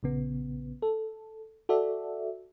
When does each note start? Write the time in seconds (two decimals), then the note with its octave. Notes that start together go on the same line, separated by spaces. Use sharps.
0.03 A#1 C#3 B3
0.82 A4
1.69 F#4 A4 D5 E5